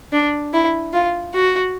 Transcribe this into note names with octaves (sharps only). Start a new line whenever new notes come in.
D4
E4
F4
F#4